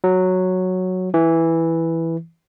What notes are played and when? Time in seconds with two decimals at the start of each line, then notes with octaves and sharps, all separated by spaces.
0.04 F#3
1.14 E3